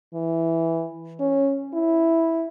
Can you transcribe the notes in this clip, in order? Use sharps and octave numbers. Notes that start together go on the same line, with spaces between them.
E3
C#4
E4